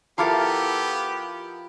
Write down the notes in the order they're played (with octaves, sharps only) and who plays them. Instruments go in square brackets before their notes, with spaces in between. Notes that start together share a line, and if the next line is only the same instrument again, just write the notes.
[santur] F3 E4 D6 [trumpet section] B3 G4 [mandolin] A4 A#4 F5